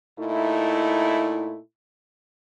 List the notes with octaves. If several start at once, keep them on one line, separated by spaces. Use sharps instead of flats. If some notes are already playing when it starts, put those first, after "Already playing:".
A#2 A3 D#4 E4